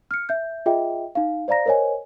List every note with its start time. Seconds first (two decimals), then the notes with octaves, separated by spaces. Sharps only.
0.11 F6 C#7
0.29 E5 G6
0.66 F4 G#4 D#5 E5 G5
1.15 D#4 F5
1.48 C5 D5 F5 A#5 A#6
1.66 A#4 C5 C#5 D#5 G#5